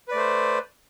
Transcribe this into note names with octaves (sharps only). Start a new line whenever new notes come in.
A3 B4 C5 D5